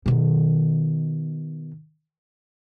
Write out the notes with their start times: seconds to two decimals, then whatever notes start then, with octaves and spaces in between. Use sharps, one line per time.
0.06 B2 D#3